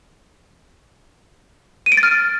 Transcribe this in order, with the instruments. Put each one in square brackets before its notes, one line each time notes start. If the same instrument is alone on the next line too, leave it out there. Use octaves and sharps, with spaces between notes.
[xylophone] D#7
D7
A6
F6